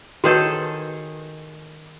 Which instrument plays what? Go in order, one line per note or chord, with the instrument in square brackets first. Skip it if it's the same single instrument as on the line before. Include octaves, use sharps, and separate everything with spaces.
[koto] D#3 G#4 A4 [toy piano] F#4 B4 C#5